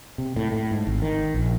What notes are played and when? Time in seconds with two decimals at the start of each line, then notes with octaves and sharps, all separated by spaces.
0.18 C3
0.36 A2
0.52 A2
0.71 G#2
0.87 G#1
1.02 D#3
1.34 A#1